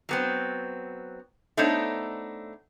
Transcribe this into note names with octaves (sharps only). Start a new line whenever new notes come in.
F#3 B3 C4
A3 B3 D4 D#4 C5 C#5